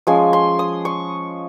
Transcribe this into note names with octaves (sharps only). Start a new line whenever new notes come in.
F3 G#3 C#4 G#5
C6
D#6
C#6